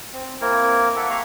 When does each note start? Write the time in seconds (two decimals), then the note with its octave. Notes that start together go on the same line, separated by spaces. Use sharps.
0.13 C4
0.41 A#3 C4 E4 A#4
0.96 A#3 A4 E5 F#5
1.10 G4 F5 A#5 C#6